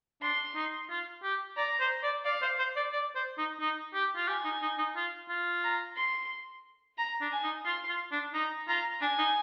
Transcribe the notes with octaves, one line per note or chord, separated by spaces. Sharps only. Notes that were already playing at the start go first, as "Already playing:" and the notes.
D4 C6
D#4
F4
G4
D5 A#5
C5
D5
D5 F5
C5
C5
D5
D5
C5
D#4
D#4
G4
F4
G4 G#5
D#4
D#4
D#4
F4
F4
A#5
C6
A#5
D4
G#5
D#4
F4 C6
F4
D4
D#4 A#5
F4 A#5
D4 G#5
D#4